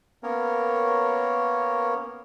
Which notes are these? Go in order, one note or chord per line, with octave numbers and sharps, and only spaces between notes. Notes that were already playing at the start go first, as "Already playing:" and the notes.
A#3 B3 C#4 A#4 C#5